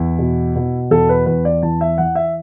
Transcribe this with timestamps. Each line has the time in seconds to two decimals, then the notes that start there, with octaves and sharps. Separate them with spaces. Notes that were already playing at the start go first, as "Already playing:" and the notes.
Already playing: E2 E4
0.18 B2
0.55 B2
0.91 E2 A4
1.09 B4
1.26 E2 B4
1.45 D5
1.62 E3 A5
1.81 E5
1.98 E3 F#5
2.15 E5